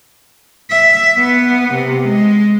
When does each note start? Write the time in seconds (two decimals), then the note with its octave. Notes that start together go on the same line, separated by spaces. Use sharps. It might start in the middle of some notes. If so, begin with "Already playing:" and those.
0.70 E5
1.18 B3
1.74 C3
2.07 G#3